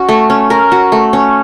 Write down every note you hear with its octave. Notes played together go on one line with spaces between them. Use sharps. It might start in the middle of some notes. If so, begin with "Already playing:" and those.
Already playing: C#4 F#4
A3
C#4
A#4
F#4
A3
C#4